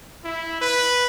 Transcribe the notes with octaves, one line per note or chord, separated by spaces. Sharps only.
E4
B4